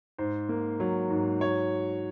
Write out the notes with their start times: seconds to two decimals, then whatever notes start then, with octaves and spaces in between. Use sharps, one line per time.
0.18 G#2 C5
0.49 A#3
0.80 F#3
1.10 G#2
1.41 F#3 C#5